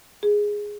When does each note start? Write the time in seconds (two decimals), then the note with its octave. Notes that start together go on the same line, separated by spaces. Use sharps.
0.23 G#4